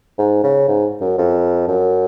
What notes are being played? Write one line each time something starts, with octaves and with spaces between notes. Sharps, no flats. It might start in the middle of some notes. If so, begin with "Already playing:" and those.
G#2
C#3
G#2
F#2
F2
F#2